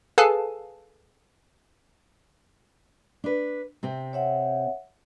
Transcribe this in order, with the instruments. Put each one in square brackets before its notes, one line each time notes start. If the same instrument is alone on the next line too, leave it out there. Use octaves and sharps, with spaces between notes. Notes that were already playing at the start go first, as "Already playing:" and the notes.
[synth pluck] G#4 A4 B4 F5 G#5 A5
[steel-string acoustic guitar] D4 B4
C3 C4
[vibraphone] C#5 E5 F#5